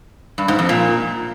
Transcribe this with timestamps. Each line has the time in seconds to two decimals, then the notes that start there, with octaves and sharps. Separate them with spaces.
0.38 G2
0.48 G#2
0.59 F2
0.69 A#2